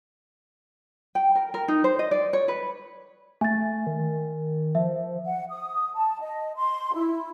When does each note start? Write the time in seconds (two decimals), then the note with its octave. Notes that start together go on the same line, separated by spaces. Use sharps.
1.15 G5
1.35 A#4
1.54 A#4
1.68 D#4
1.84 C5
1.99 D#5
2.11 D5
2.33 C#5
2.48 B4
3.41 A3 G#5 A6
3.87 D#3
4.75 F3 E5
5.24 F#5
5.50 D#6
5.94 A5
6.20 D#5
6.56 C6
6.94 E4